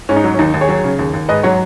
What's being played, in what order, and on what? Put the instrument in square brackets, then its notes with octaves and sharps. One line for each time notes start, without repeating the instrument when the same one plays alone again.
[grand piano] G#2 C#4
D#4
F#3
C#4
D#2 D#4
D#2
G#4 C#5
F#3
C#3
D#2
D#2
G#2 B4 D#5
F#3 C#5 F#5